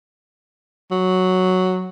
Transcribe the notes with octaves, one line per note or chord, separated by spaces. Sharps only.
F#3